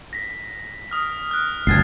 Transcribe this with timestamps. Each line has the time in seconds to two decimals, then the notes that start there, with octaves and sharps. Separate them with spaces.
0.13 A#6 B6
0.91 D#6 F6
1.31 F6 F#6
1.67 F#1 D2 G#6 A6 C7